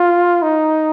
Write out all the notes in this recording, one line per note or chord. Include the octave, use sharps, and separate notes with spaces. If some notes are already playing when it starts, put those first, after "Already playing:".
Already playing: F4
D#4